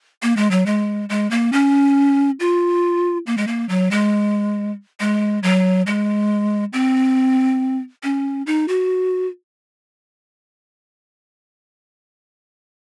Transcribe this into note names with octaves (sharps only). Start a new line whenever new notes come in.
A#3
G#3
F#3
G#3
G#3
A#3
C#4
F4
A#3
G#3
A#3
F#3
G#3
G#3
F#3
G#3
C4
C#4
D#4
F#4